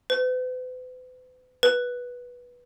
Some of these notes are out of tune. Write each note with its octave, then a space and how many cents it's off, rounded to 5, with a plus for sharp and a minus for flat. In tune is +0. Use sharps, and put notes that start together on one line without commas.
B4 +45
B4 -15